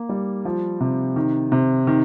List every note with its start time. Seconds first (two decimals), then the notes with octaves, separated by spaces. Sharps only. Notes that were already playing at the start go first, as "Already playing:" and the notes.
Already playing: A#3
0.09 G3
0.45 F3
0.81 C3
1.16 D#3
1.52 C3
1.87 D#3